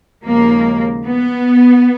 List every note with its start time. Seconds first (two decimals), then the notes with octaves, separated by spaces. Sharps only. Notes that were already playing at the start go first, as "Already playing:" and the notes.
0.25 D#2 C#3 F3 G#3 A#3
1.04 B3